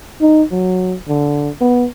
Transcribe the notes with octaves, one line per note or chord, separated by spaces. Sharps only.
D#4
F#3
D3
B3